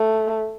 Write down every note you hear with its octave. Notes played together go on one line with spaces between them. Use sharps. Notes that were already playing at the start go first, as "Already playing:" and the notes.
Already playing: A3